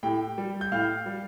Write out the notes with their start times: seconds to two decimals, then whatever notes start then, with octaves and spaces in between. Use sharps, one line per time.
0.03 A2 G4 G5
0.38 G3
0.61 G6
0.72 A2 F5 F6
1.06 G3